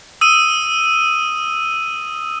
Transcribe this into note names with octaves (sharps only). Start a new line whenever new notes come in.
D#6 E6 D#7